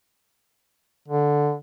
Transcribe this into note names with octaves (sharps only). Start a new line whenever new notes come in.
D3